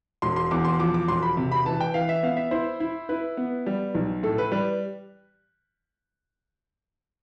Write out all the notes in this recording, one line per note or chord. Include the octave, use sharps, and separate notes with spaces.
E1 C6
C6
E2 D6
C6
F3 D6
D6
E1 C6
B5
C3
B5
E3 A5
G5
E3 F5
E5
B3 F5
E5
E4 C5
E4
E4 B4
B3
G3
B1
A2 A4
B4
G3 B4